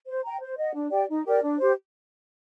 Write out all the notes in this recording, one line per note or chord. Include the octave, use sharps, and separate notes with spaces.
C5
G5 A#5
C5
D#5 F#5
D4
G4 D5 G5
D#4
G4 A#4 D5
D4
G4 C5